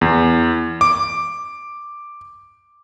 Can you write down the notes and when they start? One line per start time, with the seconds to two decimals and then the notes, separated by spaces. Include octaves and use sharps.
0.01 E2
0.81 D6